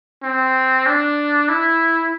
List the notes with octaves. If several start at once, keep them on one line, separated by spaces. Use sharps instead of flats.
C4
D4
E4